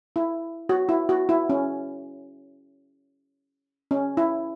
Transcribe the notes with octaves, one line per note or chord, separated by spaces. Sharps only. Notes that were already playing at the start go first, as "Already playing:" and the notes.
E4
F#4
E4
F#4
E4
C#4
C#4
E4